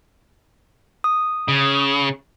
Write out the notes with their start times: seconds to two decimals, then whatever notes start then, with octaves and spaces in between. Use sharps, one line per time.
1.04 D#6
1.48 C#3